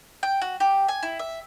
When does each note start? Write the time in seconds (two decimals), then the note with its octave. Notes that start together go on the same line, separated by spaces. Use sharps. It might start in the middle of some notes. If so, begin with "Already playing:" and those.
0.23 G5
0.41 F#4
0.60 G4
0.88 G#5
1.03 E4
1.19 E5